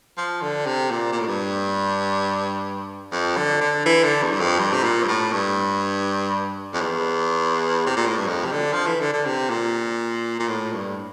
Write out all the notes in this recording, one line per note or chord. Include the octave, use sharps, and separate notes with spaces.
F3
D3
C3
A#2
A#2
A2
G2
F2
D3
D3
E3
D3
E2
G2
F2
G2
C3
A#2
G2
A2
G2
F2
E2
C3
A#2
A2
G2
F2
C3
D3
F3
E3
D3
D3
C3
A#2
A#2
A2
G2